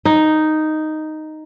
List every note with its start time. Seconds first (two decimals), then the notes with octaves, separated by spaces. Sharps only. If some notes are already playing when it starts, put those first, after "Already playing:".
0.05 D#4